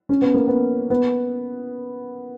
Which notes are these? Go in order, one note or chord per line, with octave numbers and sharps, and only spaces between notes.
C#4
B3
A#3
B3
B3